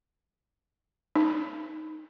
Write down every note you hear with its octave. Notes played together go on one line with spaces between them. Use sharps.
D#4